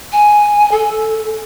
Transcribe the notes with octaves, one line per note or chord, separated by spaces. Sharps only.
G#5
A4